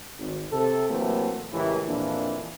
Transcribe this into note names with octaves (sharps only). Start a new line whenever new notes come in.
G#1
C3 A4
C3 E3 F#3 A3 A#3
C#2 A2 E3 E4 G4 A#4
F2 A#2 E3 A#3 D4